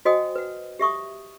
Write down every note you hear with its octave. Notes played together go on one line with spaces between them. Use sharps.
F#4 C5 D#5 G5 G#5 D#6
B4 F#5
G4 E5 C#6 D#6